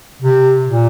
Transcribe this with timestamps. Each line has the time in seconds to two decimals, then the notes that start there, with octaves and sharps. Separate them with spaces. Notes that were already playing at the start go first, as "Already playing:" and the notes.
0.22 C3
0.66 A#2